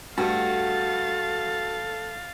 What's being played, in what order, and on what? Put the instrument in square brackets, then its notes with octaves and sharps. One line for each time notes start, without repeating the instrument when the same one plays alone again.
[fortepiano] G2 G3 A3 [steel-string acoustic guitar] F#4 [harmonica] A4 [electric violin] F5 A6